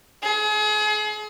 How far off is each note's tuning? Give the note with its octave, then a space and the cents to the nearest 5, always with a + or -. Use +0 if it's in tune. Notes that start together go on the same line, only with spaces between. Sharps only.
G#4 +35